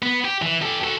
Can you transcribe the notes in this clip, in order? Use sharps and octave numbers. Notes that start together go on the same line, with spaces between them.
B3
G4
E3
G4 A4
F#4 A4